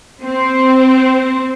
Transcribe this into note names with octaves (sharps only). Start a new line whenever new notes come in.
C4